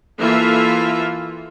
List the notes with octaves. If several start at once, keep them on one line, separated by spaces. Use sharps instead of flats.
E3 A#3 F4 A4 E5